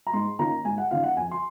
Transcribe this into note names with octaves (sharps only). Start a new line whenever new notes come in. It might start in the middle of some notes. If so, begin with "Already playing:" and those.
A#5
G#2 C6
D#3 A#3 C#4 F4 A#5
G#2 G#5
F#5
D#3 A#3 C#4 F4 F5
F#5
F2 G#5
C6